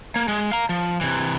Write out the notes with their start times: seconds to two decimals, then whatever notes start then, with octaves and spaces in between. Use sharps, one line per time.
0.16 A#3
0.28 G#3
0.52 F5 A#5
0.69 F3
1.01 C3 E3